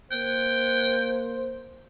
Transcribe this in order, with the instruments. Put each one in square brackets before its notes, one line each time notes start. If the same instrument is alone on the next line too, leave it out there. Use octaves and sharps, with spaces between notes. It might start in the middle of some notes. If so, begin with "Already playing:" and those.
[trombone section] A#3 C5 [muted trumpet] G5